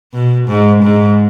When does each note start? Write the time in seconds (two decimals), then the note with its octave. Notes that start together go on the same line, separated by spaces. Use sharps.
0.13 B2
0.48 G#2
0.83 G#2